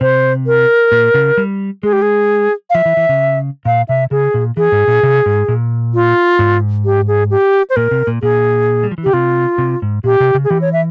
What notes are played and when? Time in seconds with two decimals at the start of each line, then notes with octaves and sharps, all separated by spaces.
0.01 C3 C5
0.47 A#4
0.92 A#2
1.14 C#3
1.37 G3
1.83 G#3 G#4
1.93 G4
2.02 G#4
2.70 F5
2.75 F3 E5
2.85 E3
2.97 E3
3.09 C#3
3.65 A#2 F5
3.89 C3 E5
4.11 C#3 G#4
4.34 A#2
4.57 E3 G#4
4.72 G#2
4.88 A#2
5.03 C3
5.26 G#2
5.48 A#2
5.94 F4
6.39 G#2
6.85 G4
7.08 G#4
7.31 G4
7.70 C5
7.76 A#2 A#4
7.91 C3
8.07 A#2
8.22 A#2 G#4
8.83 G3
8.91 F3
8.98 E3
9.04 C#3 G4
9.13 C3 F4
9.58 C3
9.82 G#2
10.04 A#2 G4
10.20 C3
10.34 C#3
10.44 G#4
10.50 E3 G4
10.61 C#5
10.73 E5